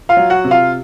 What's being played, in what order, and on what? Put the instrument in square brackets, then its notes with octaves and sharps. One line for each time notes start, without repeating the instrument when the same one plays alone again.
[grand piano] F4 F5
F#3
F#4 F#5
C3
F4 F5